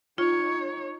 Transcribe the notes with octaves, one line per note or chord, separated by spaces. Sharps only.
D#4 F4 C#5